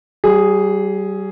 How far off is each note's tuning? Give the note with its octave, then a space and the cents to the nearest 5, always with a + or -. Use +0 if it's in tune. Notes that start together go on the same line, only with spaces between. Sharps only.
G3 -35 G#4 +0